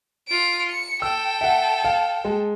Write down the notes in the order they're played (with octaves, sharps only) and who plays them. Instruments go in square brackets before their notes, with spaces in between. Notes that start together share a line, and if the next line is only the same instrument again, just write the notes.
[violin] F4 D7
C#7
[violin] A4 G5 [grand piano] E6
[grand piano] E5 F#5
F5
G#3